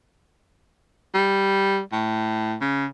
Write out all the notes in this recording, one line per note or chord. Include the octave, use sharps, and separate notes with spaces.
G3
A2
C#3